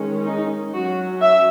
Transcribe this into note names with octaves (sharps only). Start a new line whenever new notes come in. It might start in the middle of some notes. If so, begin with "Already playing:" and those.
Already playing: D#3 G#3 C#4
D#4
F#3 C#4 F#4
E5